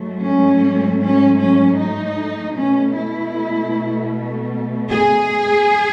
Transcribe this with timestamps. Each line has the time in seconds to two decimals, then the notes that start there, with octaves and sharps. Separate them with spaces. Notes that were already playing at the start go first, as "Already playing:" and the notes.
Already playing: G#2 F#3 A3
0.23 C#4
1.01 C#4
1.40 C#4
1.78 D#4
2.56 B2 A3 C#4
2.95 E4
4.89 G#4